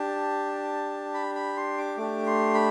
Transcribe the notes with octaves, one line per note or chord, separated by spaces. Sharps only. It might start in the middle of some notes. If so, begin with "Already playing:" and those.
Already playing: D4 G4 A5
B5
B5
C6
D6
A3 D4 G4 D6
C6
B5